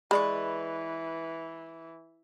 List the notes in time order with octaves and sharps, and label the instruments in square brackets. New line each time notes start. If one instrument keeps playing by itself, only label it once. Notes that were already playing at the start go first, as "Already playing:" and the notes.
[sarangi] E3 [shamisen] G#3 [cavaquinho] B4 D5 C#6 [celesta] B5